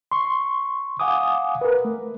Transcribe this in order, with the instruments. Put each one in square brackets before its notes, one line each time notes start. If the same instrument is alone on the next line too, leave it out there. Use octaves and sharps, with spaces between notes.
[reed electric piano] C6 C#6
F5 F#5 G#5 D6 D#6
A#4 B4
A3